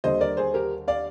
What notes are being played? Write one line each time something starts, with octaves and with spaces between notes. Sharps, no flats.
D#2 D3 G3 C5 D#5
A#4 D5
G#4 C5
G4 A#4
D5 F5